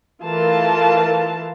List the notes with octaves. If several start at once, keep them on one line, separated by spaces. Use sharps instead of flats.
E3 A3 F4 A#4 B4 A5